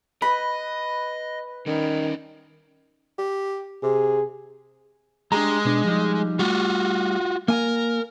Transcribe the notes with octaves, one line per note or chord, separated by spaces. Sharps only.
B4 D#5 B5
D#3 G3 C#4
G4
C3 G#4
G#3 D4 G4 A#5
B2 D4
F3 G3 D#4
G3 A3 F4 F#4
A#3 A#4 F5 G#5